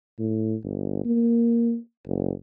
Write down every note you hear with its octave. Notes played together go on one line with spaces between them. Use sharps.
A2
G1
A#3
F#1